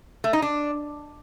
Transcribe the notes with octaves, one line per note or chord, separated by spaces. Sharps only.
A3
D#4
D4